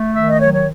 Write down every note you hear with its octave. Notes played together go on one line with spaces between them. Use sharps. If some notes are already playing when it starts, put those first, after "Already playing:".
Already playing: A3
D#3 E5
D#5
F#3 C#5
C#5